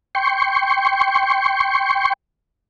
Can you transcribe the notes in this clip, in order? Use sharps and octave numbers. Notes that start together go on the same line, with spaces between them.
G5 C6 C#6